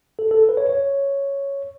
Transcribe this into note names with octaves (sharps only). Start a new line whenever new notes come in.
A4
A4
B4
C#5
C#5